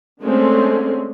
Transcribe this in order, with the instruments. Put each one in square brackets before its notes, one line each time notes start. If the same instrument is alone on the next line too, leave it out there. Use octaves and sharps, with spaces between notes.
[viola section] D3 G#3 A3 C4 C#4